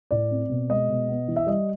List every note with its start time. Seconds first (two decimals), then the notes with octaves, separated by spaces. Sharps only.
0.11 A2 D5
0.31 C4
0.49 B2
0.70 G#3 D#5
0.90 B2
1.08 B3
1.28 E3
1.36 E5
1.47 G3 D#5